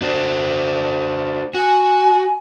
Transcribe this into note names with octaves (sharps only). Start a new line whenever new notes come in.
D4 F#4 C5
F#4 G#5